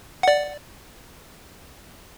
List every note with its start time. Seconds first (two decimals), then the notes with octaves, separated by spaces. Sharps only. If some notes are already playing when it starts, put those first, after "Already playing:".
0.23 D5 F#5